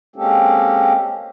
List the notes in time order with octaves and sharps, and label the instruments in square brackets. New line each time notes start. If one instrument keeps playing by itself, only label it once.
[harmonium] G#3 A#3 C4 C#4 G4 A4